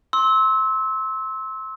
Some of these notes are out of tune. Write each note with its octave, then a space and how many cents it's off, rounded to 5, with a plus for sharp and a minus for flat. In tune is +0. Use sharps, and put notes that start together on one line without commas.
C6 +20 E6 -25